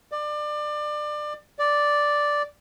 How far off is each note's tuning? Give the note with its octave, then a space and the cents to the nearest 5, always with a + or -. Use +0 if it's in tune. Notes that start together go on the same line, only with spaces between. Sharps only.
D5 +25
D5 -5